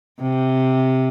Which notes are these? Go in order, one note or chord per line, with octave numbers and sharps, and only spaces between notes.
C3